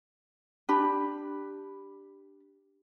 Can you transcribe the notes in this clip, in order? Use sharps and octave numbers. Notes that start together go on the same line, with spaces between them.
D4 G4 B5